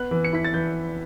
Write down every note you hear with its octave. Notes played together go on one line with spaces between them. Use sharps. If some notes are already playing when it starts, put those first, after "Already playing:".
Already playing: B3 F#6
E3
C#7
E4 B6
A6
E3 G6